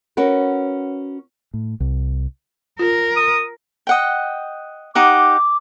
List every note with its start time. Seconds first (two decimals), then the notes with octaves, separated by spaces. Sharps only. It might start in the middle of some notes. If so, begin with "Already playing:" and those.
0.17 C#4 F#4 A#4 B4
1.54 A2
1.80 C2
2.79 F4 A#4
3.17 D#6
3.87 D#5 F#5 G5
4.95 D#4 G4 F#5 D6